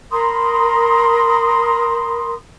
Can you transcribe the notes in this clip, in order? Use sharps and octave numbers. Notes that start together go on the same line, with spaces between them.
A#4 B5 C6 D#6